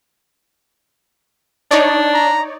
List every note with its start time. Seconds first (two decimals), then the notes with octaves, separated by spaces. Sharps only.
1.71 D4 D#4 C#5 D5
2.14 A#5